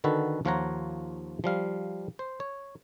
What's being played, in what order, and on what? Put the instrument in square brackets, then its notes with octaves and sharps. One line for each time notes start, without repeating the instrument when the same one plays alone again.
[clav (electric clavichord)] D3 D#3 F#4 A4 B4
D#2 F3 F4 C#5 F#5 A#5
F3 G3 F5
C5
C#5